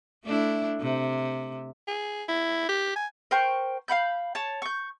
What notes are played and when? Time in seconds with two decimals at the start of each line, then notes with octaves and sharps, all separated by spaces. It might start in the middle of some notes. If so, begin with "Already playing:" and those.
0.24 A3 D4 E4
0.80 C3
1.88 G#4
2.29 E4
2.69 G4
2.96 G#5
3.31 A#4 C5 G5 C#6
3.88 F5 F#5 B5 G6
4.35 C#5 A5
4.62 C#6 G6